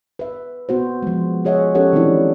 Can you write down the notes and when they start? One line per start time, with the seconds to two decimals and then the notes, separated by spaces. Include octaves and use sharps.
0.19 B4 E5
0.69 B3 F#4 C5
1.02 F3 G#3
1.45 F4 G#4 C#5 D#5 E5 F#5
1.75 F3 C#4 G4 A4 C#5 F#5
1.93 D#3 E3 G#3 C4 D4 E4